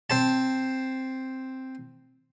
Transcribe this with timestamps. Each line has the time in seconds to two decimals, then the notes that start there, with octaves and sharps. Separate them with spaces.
0.10 C4 C5 A5